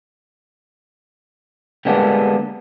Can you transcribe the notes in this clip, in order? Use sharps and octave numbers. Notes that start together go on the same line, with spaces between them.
D3 G3 G#3 A#3 B3 D4